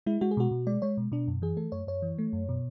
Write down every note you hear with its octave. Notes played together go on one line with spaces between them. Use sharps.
G#3 E4
G#3 F#4
G#4
B2 F#4
B2
G#3 D5
G#3 C#5
B2
B2 D4
F#2
E3 G#4
A3 A4
F#2 C#5
F#2 C#5
E3
A3
F#2
B2